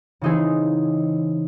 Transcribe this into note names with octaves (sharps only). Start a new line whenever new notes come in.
C#3 E3 C4 D#4 G#4